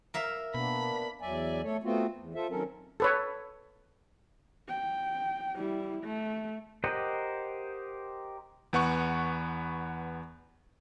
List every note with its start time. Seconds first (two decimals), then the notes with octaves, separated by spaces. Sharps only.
0.14 A#4 E5 F5
0.54 B2 A#3 B3 D4 B5
1.21 E2 F#3 D5 E5 G#5
1.63 A3 A4 C#5
1.84 A3 B3 C4 F4 F#4
2.17 E2
2.35 F4 A4 C5 E5
2.50 D#3 F#3 C4 C#4 A4 A#4
3.00 A4 B4 C#5
4.68 G5
5.55 G3 E4
6.04 A3
6.84 G4 A#4 C5 D#5 F#5
8.73 E2 B3 F#5 C#6